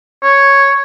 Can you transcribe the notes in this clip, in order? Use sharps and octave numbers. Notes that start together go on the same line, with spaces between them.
C#5